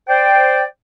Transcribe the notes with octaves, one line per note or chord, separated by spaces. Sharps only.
C5 D5 G5